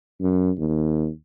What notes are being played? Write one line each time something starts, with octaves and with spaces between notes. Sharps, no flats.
F#2
D#2